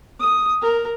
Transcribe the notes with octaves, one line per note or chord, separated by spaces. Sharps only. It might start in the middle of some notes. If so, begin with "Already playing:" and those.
D#6
A#4